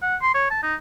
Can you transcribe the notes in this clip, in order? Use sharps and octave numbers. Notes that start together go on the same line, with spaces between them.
F#5
C6
C#5
A5
D#4